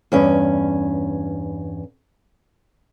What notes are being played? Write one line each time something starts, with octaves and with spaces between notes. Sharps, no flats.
E2 G2 C#4